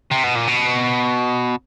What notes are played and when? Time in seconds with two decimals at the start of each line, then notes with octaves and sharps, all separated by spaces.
0.11 C3
0.23 B2
0.35 A#2
0.47 B2